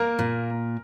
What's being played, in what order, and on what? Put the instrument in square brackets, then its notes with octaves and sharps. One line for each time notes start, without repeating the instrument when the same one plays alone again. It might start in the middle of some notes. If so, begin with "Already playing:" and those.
Already playing: [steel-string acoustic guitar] A#3 [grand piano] A#4
[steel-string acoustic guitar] A#2